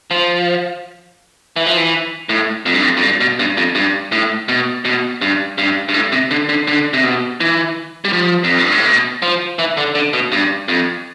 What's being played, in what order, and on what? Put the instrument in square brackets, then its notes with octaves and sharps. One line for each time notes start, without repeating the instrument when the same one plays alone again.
[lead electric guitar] F3
E3
F3
E3
A2
F2
G2
F2
F2
G2
B2
G2
F2
G2
A2
B2
B2
G2
G2
G2
A2
C3
D3
D3
D3
C3
B2
E3
G3
F3
F2
G2
A2
B2
F3
E3
D3
D3
B2
G2
F2